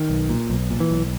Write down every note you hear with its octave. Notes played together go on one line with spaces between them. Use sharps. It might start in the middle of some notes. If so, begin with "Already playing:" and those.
Already playing: D#3
B1
A#2
B1
A#2
E3
B1